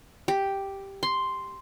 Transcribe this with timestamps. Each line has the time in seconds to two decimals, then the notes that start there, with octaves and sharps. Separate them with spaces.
0.28 G4
1.03 C6